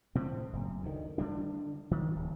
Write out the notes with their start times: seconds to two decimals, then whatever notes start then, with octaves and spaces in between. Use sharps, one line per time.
0.15 A2 C3 C4
0.53 F#1
0.83 D2 D#3
1.18 D3 G3 D4
1.91 D#3
2.16 D1